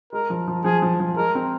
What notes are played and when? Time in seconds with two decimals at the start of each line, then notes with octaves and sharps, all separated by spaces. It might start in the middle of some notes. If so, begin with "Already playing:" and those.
0.13 G#3 A#4
0.30 F3
0.48 F3
0.64 F3 G#4
0.82 F3
1.00 F3
1.17 G#3 A#4
1.35 C4